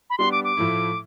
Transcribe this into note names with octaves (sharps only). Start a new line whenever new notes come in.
B5
G3 B3 D4 G4 C6
D6
D6
A2 F3 A3 E4